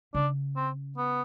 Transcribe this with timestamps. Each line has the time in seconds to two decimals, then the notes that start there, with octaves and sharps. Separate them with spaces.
0.15 C#3 D4
0.57 C4
0.98 B3